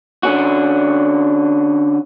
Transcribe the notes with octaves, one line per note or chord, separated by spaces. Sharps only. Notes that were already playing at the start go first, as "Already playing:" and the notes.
D3 C#4 F#4